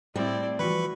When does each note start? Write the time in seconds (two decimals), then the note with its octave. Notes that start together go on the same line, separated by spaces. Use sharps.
0.16 A2 G3 C4 E4 D5
0.59 E3 F3 F#4 B4 B5 C#6